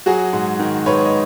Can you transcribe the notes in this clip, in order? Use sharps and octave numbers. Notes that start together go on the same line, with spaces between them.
F#3 F#4 G#4
G#2
D#3
G#2 B4 C#5
D#5